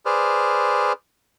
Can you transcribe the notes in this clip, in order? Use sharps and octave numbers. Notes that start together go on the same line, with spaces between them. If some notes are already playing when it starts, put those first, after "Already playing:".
G#4 B4 C5 D5 F6